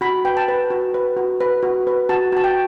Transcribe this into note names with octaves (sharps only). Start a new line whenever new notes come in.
F#4 B5
B4 G5
A5
B4
F#4
B4
F#4
B4
F#4
B4
F#4 A5
F#4 A5
G5